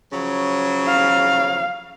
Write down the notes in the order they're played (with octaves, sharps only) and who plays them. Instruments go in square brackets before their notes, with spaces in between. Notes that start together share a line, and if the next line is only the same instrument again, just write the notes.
[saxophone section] C#3 F3 F#3
[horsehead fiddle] F5